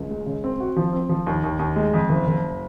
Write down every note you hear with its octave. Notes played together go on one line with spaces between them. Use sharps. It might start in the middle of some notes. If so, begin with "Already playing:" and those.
Already playing: C#2
G#3
C#3
C4
F#4
F3
C4
F3
D#2
D#2
D#2
G#3
F2
F#1
F#1